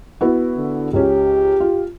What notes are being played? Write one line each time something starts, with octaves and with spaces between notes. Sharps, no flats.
B3 E4 F#4
D3
C#2 C#4 G4
F4